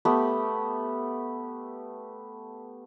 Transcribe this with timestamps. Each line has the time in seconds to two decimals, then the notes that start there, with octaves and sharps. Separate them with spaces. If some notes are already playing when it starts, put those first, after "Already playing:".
0.05 A3 B3 G4